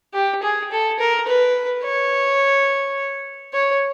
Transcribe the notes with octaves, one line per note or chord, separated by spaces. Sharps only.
G4
G#4
A4
A#4
B4
C#5
C#5